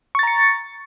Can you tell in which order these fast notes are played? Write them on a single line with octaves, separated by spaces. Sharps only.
C#6 A6 A#5 C#7